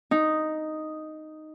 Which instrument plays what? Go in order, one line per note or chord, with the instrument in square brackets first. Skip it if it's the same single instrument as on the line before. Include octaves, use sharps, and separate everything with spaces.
[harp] D#4